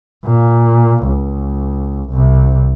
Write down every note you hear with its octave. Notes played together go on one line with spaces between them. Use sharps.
A#2
C#2
C2 C3